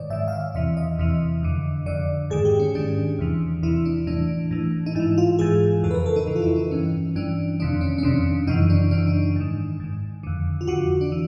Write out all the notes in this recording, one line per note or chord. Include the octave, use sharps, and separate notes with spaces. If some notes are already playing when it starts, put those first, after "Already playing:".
Already playing: G#2 D#3 C#5 D5
G#2 D#3 E5
F5
E5
E2 C3 E3 E5
D#5
E2 C3 E3
F2 D3
F2 D3 D5
G#2 D#3 G#4
G4
C#4
G#2 D#3 D4
E2 C3 E3
E2 C3 E3 E4
D4
A2 E3 D4
A2 E3
D#4
G#2 E3 E4
F4
G#2 E3 G#4
F2 C#3 E3 A4
B4
A#4
A4
D#4
F2 C#3 E3
F4
E4
D#4
G2 E3 C#4
G2 E3 D4
F2 C3 D#3 D4
C#4
C#4
F2 C3 D#3 D4
F#2 C#3 E3 D#4
D4
F#2 C#3 E3 D4
D#4
D#4
G#2 D#3
G#2 D#3
F2 D3
F4
F2 D3 F#4
D4
E3